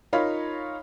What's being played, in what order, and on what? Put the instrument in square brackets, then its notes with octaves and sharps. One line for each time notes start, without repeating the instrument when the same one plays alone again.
[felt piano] D#4 F4 A#4 C#5 F5 B5